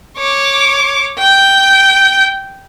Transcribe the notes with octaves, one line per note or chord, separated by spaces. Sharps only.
C#5 D6
G5 G6